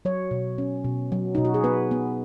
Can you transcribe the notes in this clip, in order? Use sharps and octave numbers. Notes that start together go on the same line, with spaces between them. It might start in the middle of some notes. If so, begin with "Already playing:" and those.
F#3 C#5
B2
C#4
B2
F#3
B2 D#4
F#4
G#4
B3 B4
B3